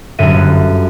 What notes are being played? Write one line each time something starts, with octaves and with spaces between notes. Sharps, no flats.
G1 F#2 E5 D#7